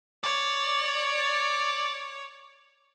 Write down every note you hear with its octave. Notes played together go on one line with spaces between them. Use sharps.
C#5 D5